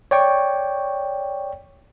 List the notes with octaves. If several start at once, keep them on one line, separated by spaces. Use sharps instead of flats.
C#5 D5 G5 C#6